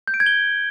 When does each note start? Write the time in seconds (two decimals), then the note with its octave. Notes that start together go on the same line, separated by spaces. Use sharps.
0.08 G6
0.14 D7
0.20 G#6
0.26 G7